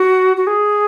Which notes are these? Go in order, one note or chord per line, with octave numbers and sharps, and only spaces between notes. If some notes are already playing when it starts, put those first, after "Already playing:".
Already playing: F#4
F#4
G#4